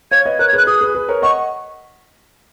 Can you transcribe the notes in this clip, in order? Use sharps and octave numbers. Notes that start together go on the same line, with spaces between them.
C#5 F5 G#6
B4 D#5
A#4 C#5 F#6
G#6
G#4 B4 F#6
G#4 B4 D#6
G#4 B4
G#4 B4
A#4 C#5
D#5 F#5 C#6